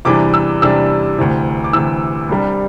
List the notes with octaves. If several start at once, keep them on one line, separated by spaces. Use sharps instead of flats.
E2 C3 E3 G3 D4 D6
E6
E2 C3 E3 G3 D4 E6
D2 C3 E3
D6
D2 C3 E3 E6
C2 C3 G3 D4